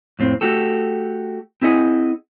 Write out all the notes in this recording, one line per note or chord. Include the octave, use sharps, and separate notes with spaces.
F2 A2 C4
A3 F#4 G4 A4
C4 E4 G#4 D#5 F#5